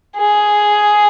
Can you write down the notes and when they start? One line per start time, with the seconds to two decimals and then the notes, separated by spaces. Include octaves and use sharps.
0.16 G#4